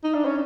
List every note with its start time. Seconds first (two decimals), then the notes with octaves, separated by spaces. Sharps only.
0.04 D#4
0.14 D4
0.25 C#4